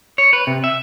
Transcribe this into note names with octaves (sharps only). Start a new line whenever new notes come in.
C#5
B4
C3
E5